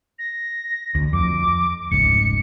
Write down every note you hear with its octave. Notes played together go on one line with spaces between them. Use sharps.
A#6
D2
F2 D6
F1 C#2 G#2 C#7